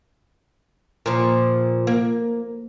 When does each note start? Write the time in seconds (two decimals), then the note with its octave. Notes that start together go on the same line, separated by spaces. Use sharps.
1.06 A#2 F3
1.87 A#3